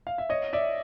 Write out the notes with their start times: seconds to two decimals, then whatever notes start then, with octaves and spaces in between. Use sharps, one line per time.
0.07 F5
0.18 E5
0.29 C#5 D#5
0.53 D5 E5